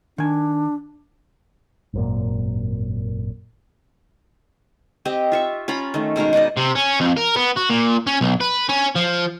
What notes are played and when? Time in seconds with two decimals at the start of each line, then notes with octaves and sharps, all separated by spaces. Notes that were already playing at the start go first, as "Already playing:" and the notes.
0.18 D#3 D4 G#5
1.93 G#1 F#2 A#2
5.05 C4 G4 D#5
5.32 F4 E5 C#6
5.68 C#4 F4 A#5 B5
5.94 D#3 A3
6.16 B2 G#3 D#4 A#4
6.33 D#4 B4 D5 D#5
6.57 C3
6.75 C#4
7.01 F2
7.17 A#4
7.36 B3
7.56 F#4
7.70 A#2
8.07 C#4
8.21 B1
8.40 B4
8.69 C#4
8.95 F3